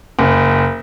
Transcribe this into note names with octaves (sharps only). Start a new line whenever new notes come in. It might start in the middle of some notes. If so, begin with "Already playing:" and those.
F#1